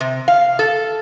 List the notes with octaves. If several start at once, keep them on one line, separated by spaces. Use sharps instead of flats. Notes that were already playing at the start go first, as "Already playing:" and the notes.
C3
F5
A4